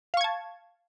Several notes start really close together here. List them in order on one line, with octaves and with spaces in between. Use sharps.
F5 C#6 G#6 A5